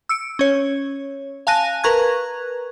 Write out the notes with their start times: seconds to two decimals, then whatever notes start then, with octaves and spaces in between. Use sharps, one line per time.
0.09 E6 C#7 D7
0.39 C#4 C#5
1.47 F5 G#5 A5 F#6 A#6 D#7
1.84 A#4 B4 A#5 C#6 F#6 G#6